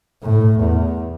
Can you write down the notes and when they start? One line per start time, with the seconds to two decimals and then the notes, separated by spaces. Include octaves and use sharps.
0.23 A2
0.59 E2